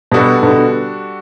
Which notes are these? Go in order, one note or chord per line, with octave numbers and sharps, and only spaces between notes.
B2 G3 D4 F#4 A4
B2 D3